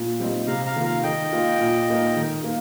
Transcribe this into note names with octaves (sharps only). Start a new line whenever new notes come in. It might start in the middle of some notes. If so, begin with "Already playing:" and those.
Already playing: A#2
G3 C4 D#4
C3 F5 A#5
F5 A#5
D#3 A#3 F4
F5 A#5
D#3 D#5 G5
A#3 F4
A#2
A#3 D#4
D#3
A#3